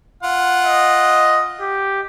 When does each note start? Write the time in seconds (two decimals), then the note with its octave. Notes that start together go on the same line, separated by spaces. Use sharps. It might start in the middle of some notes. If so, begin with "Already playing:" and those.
0.23 F4 F#5
0.65 D#5
1.61 G4